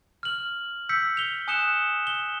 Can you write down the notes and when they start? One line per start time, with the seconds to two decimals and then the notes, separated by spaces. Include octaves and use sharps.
0.23 F6 F#7
0.89 E6 G6 B6 C#7
1.17 F7 G7
1.48 G#5 D#6 F#6 C#7 E7 G7
2.07 G7